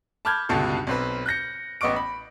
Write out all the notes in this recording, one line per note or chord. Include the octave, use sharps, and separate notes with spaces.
A5 B5 D6 F6 G6 G#6
C#2 G2 B2 D3 F4 A4
B1 C4 B4
F#6 G6 A#6 C#7
A1 B3 D#5 C#6 D6 D7
B5